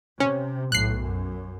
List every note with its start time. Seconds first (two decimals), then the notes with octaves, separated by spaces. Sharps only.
0.20 C3 C#4
0.72 B1 A2 F#6 C7
1.01 F#2